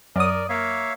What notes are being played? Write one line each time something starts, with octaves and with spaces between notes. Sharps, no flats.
F#2 A#4 D5 D#6
A#3 C#5 E5 F5